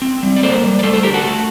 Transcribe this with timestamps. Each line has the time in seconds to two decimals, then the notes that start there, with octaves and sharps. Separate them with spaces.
0.02 C4
0.23 G3
0.36 D5
0.43 A#3 A4 C5
0.64 G3
0.79 D5
0.83 A3 A4 C5
0.93 A4 C5
1.03 D3 G4 A#4
1.14 F#4 A4
1.24 A3